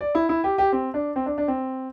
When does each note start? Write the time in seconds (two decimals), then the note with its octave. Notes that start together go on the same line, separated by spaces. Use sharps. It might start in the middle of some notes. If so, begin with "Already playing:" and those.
0.01 D5
0.15 E4
0.29 E4
0.44 G4
0.58 G4
0.72 C4
0.94 D4
1.16 C4
1.26 D4
1.38 D4
1.48 C4